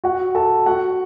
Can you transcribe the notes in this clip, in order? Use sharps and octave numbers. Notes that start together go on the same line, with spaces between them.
F#4 F#5
A4 A5
F#4 F#5